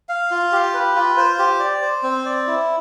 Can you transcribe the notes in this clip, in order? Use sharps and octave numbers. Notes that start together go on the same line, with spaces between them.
F5
F4
G4
B4
F4
C5
G4
D5
C5
C4
D5
E4